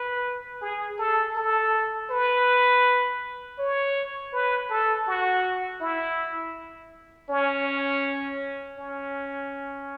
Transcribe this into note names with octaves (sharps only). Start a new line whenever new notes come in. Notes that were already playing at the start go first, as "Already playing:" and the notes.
Already playing: B4
G#4
A4
A4
B4
C#5
B4
A4
F#4
E4
C#4
C#4